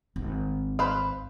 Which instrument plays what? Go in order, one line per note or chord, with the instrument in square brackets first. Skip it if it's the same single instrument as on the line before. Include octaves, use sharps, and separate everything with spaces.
[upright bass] G#1
[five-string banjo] B4 C5 F5